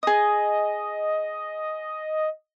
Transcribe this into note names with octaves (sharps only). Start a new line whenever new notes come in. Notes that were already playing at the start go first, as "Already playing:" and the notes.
G#4 D#5 D#6